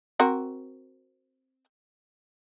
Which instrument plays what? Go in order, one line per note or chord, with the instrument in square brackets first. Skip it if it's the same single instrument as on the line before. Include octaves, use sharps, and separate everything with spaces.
[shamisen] C4 F#4 A#4